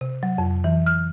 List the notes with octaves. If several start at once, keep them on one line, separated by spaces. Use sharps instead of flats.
C3
F#3
F2
E3
F6